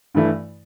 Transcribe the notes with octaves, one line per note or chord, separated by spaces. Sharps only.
G2 E3 A3 E4